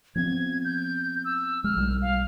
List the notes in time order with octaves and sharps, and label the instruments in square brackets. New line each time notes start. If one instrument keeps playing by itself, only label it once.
[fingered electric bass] F3 B3 C4 [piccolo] G#6
[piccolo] G6
E6
[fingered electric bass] G#3 [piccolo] F6
[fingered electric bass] B1 G3
[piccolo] F5